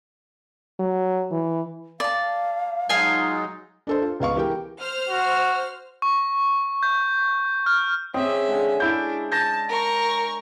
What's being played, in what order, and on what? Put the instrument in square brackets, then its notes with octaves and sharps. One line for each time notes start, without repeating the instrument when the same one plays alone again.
[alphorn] F#3
E3
[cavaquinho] D5 A5 [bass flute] F5
[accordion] F#3 G#3 D#4 [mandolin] F4 G#5
[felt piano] D4 A4 C5
F4
C#2 B3 F5 C#6
E3 G4 G#4 A#4 G5
[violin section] C5 F6
[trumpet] F#4
[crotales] C#6
G6
F6
[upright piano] C4 [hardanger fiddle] C#4 E5 [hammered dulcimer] G4 G#4 D#5
[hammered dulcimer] D3 G#3
[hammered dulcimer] C#4 [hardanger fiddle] D4 [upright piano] E4 G6
[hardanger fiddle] A5 [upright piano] G6 A#6
[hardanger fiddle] A#4 C#6